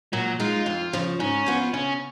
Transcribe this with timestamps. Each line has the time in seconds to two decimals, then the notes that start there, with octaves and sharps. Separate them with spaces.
0.13 A#2 F#3
0.40 G#3 D#4 F4
0.66 F2
0.93 C#3 F3
1.20 G#2 C#4
1.46 F3 B3 F4
1.73 C#3 C#4